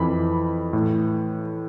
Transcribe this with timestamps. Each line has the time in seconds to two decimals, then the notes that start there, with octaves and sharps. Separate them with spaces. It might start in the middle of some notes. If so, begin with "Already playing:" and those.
Already playing: F2 E3 B5
0.73 A2 E3